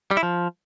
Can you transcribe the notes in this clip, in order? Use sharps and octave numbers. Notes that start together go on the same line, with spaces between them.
G3
E4
F3